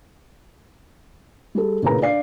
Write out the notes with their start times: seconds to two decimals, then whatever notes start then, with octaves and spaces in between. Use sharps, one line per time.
1.55 G3 G#4 A4
1.83 A#1 A2 C#3 A#4 B4 A#5
2.02 D4 D5 F5 C7